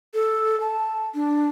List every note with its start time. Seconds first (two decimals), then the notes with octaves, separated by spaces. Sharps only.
0.14 A4
0.60 A5
1.15 D4